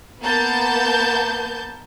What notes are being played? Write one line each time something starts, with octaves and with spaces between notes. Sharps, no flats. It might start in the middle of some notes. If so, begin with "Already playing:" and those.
A#3 B3 A5 G6